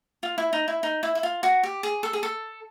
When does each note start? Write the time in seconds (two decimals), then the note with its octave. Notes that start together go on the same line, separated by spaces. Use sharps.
0.23 F4
0.38 E4
0.53 D#4
0.68 E4
0.83 D#4
1.03 E4
1.15 E4
1.23 F4
1.43 F#4
1.63 G4
1.83 G#4
2.03 A4
2.13 G#4
2.23 A4